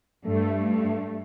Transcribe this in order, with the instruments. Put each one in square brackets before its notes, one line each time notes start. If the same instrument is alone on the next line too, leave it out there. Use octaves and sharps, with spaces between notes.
[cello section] G2 [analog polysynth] A3